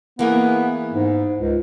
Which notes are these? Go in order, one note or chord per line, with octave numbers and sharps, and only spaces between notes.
E3 A#3 B3 G#4
G#2
C#2